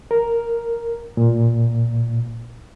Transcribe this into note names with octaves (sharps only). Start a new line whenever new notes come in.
A#4
A#2